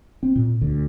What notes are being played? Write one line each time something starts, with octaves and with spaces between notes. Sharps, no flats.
C4
A#2
D2